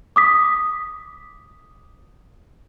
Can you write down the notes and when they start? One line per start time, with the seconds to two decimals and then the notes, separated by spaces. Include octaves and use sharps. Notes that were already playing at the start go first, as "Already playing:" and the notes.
0.16 D6 D#6 B6